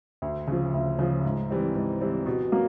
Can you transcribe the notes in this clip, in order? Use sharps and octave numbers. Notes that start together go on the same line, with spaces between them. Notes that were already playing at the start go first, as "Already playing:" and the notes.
D2
C#3 F3
D2
C#3 F3
G#2
E3 G3 C4
G#2
E3 G3 C4
B2
F#3 A#3